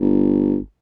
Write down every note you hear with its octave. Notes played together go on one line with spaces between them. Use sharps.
G1